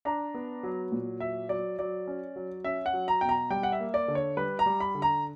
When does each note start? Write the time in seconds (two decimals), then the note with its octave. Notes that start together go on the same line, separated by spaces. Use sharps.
0.05 D4 A#5
0.34 B3
0.63 F#3
0.92 A#2
1.20 F#3 E5
1.49 F#3 D5
1.79 F#3 D5
2.07 C#4
2.36 F#3
2.64 C#4 E5
2.86 F#5
2.93 F#3
3.08 A#5
3.21 B2 G5
3.29 A#5
3.50 G3 G5
3.63 F#5
3.72 E5
3.80 A#3
3.94 D5
4.08 D3
4.15 C#5
4.37 G3 B4
4.59 A#5
4.66 G3
4.80 B5
4.95 D3
5.02 A#5